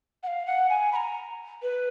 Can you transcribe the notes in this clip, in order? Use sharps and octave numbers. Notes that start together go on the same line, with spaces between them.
F#5
F5
F#5
G#5
B5
A#5
B4